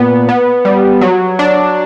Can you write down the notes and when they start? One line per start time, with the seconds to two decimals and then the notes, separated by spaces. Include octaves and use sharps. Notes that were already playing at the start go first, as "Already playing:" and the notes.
Already playing: A#2 B3
0.29 B3
0.65 G3
1.01 F#3
1.39 D4